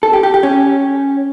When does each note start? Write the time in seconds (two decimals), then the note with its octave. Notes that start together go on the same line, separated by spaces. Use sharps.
0.03 A4
0.13 G4
0.23 G4
0.34 G4
0.43 C#4